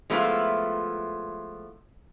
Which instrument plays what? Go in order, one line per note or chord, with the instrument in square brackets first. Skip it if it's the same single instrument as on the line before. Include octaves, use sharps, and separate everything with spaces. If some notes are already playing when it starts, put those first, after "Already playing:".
[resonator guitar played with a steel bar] F3 G#3 A3 B3 E4 F4